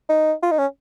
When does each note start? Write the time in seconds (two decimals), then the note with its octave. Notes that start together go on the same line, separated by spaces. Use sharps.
0.09 D#4
0.43 F4
0.51 D#4
0.58 C#4